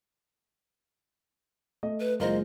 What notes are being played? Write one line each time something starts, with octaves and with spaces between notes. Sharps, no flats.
A3 D#5
B4
F#1 G#3 F4 A#4 C5 D#5